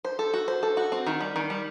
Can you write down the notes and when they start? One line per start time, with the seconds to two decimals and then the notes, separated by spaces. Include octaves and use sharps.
0.05 C5
0.19 A4
0.33 F#4
0.48 C5
0.63 A4
0.77 F#4
0.92 C4
1.06 D#3
1.21 G3
1.36 D#3
1.50 G3